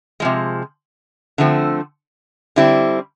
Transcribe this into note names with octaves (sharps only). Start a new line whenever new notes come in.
C3 F3 G#3
D3 F3 A3 C4
D3 G3 C4 E4